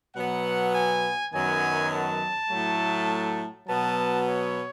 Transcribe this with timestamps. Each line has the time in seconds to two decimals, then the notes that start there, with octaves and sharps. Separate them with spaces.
0.16 B2 F#3 B3 F#5
0.75 G#5
1.33 F#2 D#3 F#3 B3 G#5
1.91 A5
2.50 A2 F#3 A3
3.68 B2 F#3 B3 A5
4.27 C#5